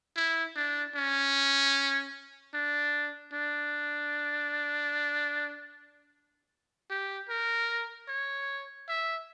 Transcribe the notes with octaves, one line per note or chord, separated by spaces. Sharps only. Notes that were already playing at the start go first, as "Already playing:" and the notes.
E4
D4
C#4
D4
D4
G4
A#4
C#5
E5